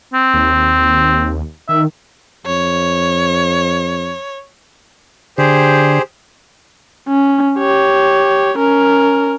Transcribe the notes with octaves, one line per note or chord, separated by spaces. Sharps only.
C4
D#2
D#3 E5
F2 C#5
D3 G4 G#4 C5
C#4
G4 C#5
C#4 A#4